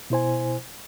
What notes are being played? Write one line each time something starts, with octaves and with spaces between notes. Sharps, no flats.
B2 E4 C5 G#5